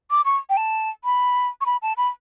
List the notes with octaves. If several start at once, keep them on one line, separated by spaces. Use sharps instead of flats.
D6
C#6
G5
A5
B5
C#6
B5
A5
B5